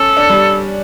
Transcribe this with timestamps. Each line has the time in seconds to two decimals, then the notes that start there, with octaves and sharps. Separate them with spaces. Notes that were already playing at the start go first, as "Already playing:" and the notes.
Already playing: C#4 A4
0.17 D4
0.30 G3